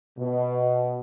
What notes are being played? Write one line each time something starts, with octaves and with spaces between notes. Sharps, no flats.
B2